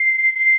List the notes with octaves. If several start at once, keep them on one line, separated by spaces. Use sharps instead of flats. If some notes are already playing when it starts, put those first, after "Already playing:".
Already playing: C7
C7